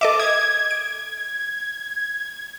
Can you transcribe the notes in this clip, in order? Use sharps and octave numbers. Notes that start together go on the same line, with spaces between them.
A4 D#5 E5 D6
D#6 G#6
D7